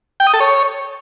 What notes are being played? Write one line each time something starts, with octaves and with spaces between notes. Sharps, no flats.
G5
D#6
A4
C#5